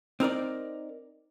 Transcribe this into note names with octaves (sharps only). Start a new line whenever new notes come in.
C4 D#4 A#4 D5